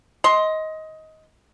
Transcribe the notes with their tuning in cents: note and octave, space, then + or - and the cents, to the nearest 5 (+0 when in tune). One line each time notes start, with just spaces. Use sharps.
D#5 +15 C6 +0